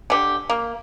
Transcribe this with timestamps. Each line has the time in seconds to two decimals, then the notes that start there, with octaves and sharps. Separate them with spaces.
0.10 D3 G4
0.50 A#3